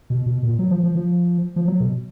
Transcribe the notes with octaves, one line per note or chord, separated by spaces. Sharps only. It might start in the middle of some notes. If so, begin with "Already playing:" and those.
B2
B2
A#2
F#3
F3
F3
F3
F3
F#3
B2